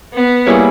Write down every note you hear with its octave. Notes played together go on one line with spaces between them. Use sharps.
B3
G3 A#3 E4 G#4 C#5